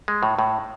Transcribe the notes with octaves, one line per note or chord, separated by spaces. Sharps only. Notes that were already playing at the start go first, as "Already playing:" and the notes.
G#3
A2
A2